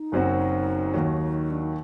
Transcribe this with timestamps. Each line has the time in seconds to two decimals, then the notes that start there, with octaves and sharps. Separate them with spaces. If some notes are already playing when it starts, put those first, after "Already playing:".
Already playing: D#4
0.12 F#1 F#2 F#3 C4 F#4
0.93 D#2 D#3 F#3
1.50 D4
1.62 D#4